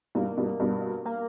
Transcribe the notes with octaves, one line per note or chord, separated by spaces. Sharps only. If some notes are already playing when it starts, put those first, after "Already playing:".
G2 B2 A#3
G2 B2
G2 B2
A#3